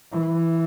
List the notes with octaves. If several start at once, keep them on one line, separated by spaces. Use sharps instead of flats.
E3